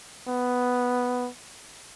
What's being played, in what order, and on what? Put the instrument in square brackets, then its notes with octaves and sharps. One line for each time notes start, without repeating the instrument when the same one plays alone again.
[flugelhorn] B3